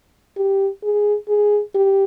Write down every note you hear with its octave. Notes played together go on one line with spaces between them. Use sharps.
G4
G#4
G#4
G4